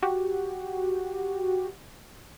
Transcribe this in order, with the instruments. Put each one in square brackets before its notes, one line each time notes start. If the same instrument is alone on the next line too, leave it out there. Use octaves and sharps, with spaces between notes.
[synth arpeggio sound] F#4 G4